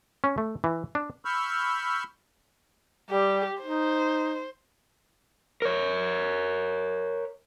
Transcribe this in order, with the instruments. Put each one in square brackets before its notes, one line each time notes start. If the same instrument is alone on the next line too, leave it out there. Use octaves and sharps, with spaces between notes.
[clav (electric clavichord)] C#4
A3
E3
D4
[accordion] B5 C#6 E6 F6 G6
[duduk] G3 [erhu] G4
[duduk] D#4 [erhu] C5
[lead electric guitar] A#4 C#5